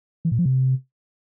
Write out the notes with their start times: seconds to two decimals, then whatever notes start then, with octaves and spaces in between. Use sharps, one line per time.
0.25 E3
0.32 A#2
0.39 F3
0.45 C3